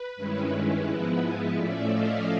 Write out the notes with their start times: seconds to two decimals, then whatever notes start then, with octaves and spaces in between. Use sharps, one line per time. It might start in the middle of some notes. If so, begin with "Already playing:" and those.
Already playing: B4
0.16 G2 D#3 G#3 C#4 E4
0.51 B4
0.86 G#2 F3 G#3 B3 E4 B4
1.56 A2 F3 A3 C#4 D5 E5
1.90 D#5 F5